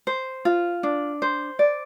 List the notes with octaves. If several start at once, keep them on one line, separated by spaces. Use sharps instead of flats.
C5
F4
D4
C5
D5